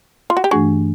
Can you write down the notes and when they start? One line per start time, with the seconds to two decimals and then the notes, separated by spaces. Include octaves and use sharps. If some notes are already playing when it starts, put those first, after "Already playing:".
0.30 F4
0.37 F#4
0.44 G4
0.51 G2 E3 A3 D4 F#4 G#4